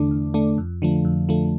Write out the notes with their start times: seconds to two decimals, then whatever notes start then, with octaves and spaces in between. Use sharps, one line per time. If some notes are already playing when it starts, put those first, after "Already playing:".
Already playing: E2 D3 A3 D4
0.11 E2
0.34 D3 A3 D4
0.58 F2
0.82 D3 F3 A3
1.05 F2
1.29 D3 F3 A3